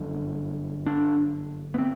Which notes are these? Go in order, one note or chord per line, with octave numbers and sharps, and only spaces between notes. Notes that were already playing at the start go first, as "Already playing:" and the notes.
Already playing: G1 F#2 D3
D4
B3
C4